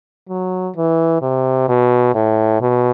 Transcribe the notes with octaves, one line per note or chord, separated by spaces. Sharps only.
F#3
E3
C3
B2
A2
B2